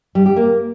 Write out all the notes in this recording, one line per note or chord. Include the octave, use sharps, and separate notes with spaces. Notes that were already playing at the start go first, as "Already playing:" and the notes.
G3
G4
A#3